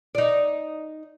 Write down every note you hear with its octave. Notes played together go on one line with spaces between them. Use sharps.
D#4 D5